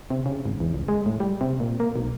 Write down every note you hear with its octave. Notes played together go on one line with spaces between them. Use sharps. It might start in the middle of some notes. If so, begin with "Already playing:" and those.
C3
C#3
G#1
E2
C#2
G#3
A2
G3
C3
A#2
A#3
B1